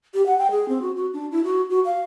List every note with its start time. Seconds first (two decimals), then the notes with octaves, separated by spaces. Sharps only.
0.14 G4
0.26 F#5
0.38 G5
0.51 G#4
0.68 C4
0.82 F#4
0.96 F#4
1.13 D4
1.32 E4
1.44 F#4
1.70 F#4
1.85 F5